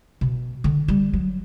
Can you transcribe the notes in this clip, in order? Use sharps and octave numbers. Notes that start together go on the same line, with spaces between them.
B2
D3
G3
F#3